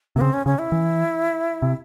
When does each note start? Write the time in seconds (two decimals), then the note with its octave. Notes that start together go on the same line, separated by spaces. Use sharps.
0.16 C3 A#3
0.21 C#3 C4
0.33 C#4
0.46 C#3 C#4
0.59 E4
0.72 E3
1.62 C3